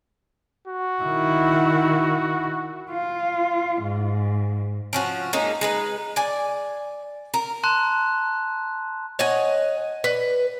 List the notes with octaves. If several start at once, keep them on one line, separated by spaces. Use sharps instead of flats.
F#4
D#3 E4
F4
G#2
F3 C#4 F#4
G#3 A#3 C#4 D#4
G#3 D#4 B4
D5 G#5
A#4
A5 A#5 C6 F#6
C#5 D#5 F#5 G#5
B4